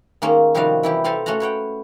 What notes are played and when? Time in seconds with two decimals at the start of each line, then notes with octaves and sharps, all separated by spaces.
0.22 D#3 G#3 A#3 C#4
0.55 C3 D#3 F3 G3 F#4 F5
0.83 E3 E4 G4
1.04 C4 G4 A4 F5 G#5 A#5
1.26 A3 C#4 F#4 F#5 A#5
1.40 B4 C#5 F#5 G5